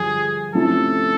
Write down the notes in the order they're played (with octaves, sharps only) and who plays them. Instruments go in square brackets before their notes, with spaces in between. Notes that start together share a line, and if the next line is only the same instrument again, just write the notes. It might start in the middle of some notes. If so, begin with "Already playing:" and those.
Already playing: [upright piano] G2 D3 F3 [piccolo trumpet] G#4
[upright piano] C3 F3 A3 C#4 E4 [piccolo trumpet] A4